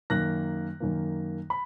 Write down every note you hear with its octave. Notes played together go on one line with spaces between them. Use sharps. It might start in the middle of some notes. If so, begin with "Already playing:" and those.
F#2 D#3 A#3 F#6 A#6
F#2 D#3 A#3
B5